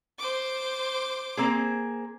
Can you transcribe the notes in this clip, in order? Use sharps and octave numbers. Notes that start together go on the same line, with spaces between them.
C5 D6
A#3 C4 G#4